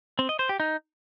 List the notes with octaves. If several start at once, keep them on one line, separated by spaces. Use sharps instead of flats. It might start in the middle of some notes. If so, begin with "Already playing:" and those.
C4
D#5
C5
G4
D#4